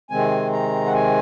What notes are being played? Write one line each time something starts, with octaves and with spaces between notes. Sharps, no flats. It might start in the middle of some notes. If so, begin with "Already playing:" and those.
C3 D#3 G#3 C4 G#5
A#5
F#5
G#5